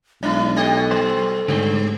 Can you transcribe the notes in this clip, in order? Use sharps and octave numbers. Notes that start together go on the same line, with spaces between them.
B1 G#3 C#4 E4
B2 G4 A4 D#5
F#3 C5
G#2 D3 G3 A3 B3